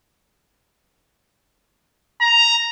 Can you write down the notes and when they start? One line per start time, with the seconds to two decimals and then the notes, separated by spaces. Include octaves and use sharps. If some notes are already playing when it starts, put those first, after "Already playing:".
2.21 A#5